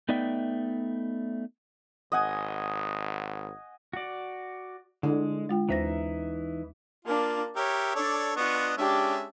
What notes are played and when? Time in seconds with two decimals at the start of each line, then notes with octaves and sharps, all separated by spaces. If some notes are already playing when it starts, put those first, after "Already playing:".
0.09 A3 B3 D#4 D5 E5 G5
2.12 G#1 D#5 F#5 G#5
3.93 F#4 D5
5.03 D3 G#3 E4
5.49 G#3 F4 G5
5.69 D#2 E3 D#4 C5 E5 A#6
7.05 A#3 D4 F4
7.56 G4 A#4 C#5 E5
7.95 D4 A4 C#5 D5
8.37 B3 D4 F4 D#5 C#6
8.77 G#3 C#4 D4 G4 E5